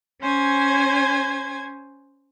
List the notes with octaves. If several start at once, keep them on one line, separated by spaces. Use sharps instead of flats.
C#4 C5 G#5 G#6